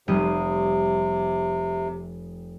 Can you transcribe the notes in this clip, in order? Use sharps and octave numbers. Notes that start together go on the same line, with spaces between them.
F1 C3 G3 D#6